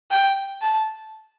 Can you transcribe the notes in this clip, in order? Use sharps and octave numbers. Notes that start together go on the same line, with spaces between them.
G5
A5